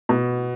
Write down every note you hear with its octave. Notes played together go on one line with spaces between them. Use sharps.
B2